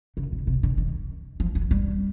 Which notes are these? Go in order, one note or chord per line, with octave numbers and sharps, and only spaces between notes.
C#3
B2
C3
D3
D#3
F3
F#3
G3